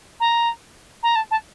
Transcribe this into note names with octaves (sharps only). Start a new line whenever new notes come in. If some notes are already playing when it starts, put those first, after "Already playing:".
A#5
A#5
A5
A5